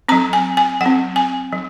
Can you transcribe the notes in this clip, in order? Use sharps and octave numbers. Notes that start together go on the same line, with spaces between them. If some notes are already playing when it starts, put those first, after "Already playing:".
F#3 C4 A#5
G#5
G#5
F#3 C4 F#5
G#5
F#3